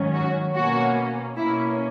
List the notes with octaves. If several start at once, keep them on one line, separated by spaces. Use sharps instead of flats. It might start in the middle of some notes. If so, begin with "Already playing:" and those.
Already playing: G#2 D#3 F#3 C#4
F#4
B2 A#3 C#4 F#4
B2 A#3 C#4 E4